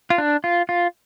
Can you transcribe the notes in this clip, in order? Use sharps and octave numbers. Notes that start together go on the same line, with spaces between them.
F4
D4
F4
F4